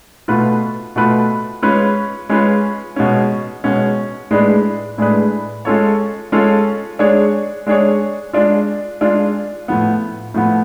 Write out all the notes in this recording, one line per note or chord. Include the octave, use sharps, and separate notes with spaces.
B2 A3 F4 B4
B2 A3 F4 B4
G#3 C#4 F4 B4
G#3 C#4 F4 B4
B2 G#3 C#4
B2 G#3 C#4
A2 G#3 D4 G#4 B4
A2 G#3 D4 G#4 B4
G#3 C#4 F4 A4 C#5
G#3 C#4 F4 A4 C#5
G#3 D4 G#4 C#5
G#3 D4 G#4 C#5
G#3 D4 F4
G#3 D4 F4
A2 F3 B3
A2 F3 B3